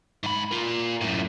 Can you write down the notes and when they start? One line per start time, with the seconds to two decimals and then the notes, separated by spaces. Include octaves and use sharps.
0.23 G#2 B5
0.51 F4 A#4
1.01 F#2 A2